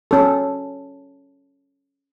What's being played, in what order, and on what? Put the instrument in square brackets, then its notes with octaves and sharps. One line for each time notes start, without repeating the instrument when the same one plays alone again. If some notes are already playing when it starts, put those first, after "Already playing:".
[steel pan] C#4 A4